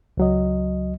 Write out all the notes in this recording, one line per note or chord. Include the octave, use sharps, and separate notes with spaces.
C#2 F#3 D#5